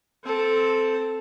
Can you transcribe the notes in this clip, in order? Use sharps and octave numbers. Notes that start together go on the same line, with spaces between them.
C4 A4